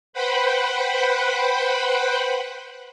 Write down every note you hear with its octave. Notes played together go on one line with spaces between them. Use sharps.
B4 C5 F#5 G5 B5